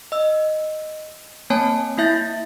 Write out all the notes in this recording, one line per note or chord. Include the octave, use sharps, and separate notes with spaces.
D#5 E6
A#3 C4 C#5 G#5 A5
A#3 E4 E5 G6 A6